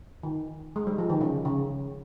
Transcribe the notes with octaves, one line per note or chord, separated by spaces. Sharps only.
D#3
G#3
G3
F3
D#3
C#3
C#3